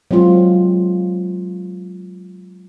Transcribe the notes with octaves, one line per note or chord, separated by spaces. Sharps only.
F#3 G#3 C4 F4